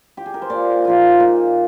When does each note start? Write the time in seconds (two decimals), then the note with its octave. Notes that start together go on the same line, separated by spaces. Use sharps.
0.17 G4
0.26 G#4
0.34 A#4
0.42 C5
0.50 A#2 D5
0.85 F3 A#3 D#4 F4
1.20 A#2